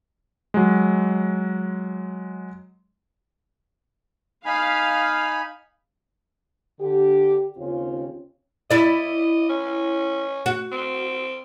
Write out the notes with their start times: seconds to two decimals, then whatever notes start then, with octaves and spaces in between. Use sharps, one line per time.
0.54 F#3 G#3
4.45 D#4 F5 G#5 B5
6.80 D3 G4
7.57 D#2 C#3 C4 C#4 F4
8.71 E4 D5 D#5
9.49 C#4
10.46 F#4
10.72 C4